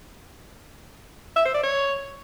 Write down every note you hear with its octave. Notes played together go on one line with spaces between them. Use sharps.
E5
C5
D5
C#5